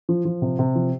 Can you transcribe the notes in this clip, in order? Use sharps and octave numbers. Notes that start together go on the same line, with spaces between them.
F3
F3
C3
C3
F3